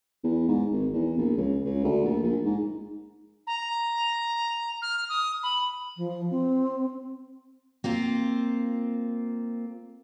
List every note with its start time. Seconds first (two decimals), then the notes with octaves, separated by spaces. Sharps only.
0.24 E2
0.48 G#2
0.72 G#1
0.93 E2
1.18 A#1
1.37 C#2
1.65 C#2
1.84 D2
2.05 A#1
2.23 A#1
2.44 G#2
3.47 A#5
4.82 F6
5.09 D#6
5.43 B5
5.97 F3
6.31 C4
7.84 A#3 C4 F4